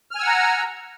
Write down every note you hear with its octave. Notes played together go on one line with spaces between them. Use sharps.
F#5 G#5 A#5 E6 F6